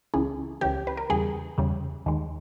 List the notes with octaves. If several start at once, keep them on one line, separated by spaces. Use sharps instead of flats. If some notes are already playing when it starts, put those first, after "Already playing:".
C#2 C#3 E3 G#4
C#2 C#3 E3 G4
B4
A#4
E2 C#3 G3 G#4
E2 C#3 G3
D#2 D#3 G#3